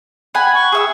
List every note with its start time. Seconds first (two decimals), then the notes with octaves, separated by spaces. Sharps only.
0.35 F#5 G#5 B5
0.54 C#6
0.72 G#4 E5 E6